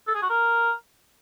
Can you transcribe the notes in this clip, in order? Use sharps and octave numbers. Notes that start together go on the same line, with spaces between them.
A4
G#4
F#4
A#4